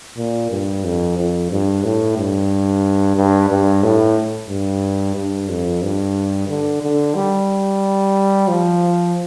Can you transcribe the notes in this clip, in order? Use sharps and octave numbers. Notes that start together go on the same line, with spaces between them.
A#2
G2
F2
F2
G2
A2
G2
G2
G2
A2
G2
G2
F2
G2
D3
D3
G3
F3